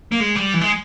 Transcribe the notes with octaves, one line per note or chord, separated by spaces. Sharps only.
A#3
G#3
G3
E3
G#3